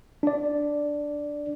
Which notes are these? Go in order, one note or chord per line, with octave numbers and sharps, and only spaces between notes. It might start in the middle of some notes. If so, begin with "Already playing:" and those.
D4 D5